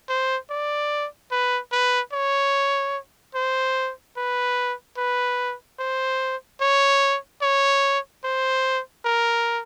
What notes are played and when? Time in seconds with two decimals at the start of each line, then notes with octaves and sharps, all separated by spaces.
0.09 C5
0.50 D5
1.31 B4
1.72 B4
2.13 C#5
3.35 C5
4.17 B4
4.97 B4
5.79 C5
6.61 C#5
7.42 C#5
8.24 C5
9.05 A#4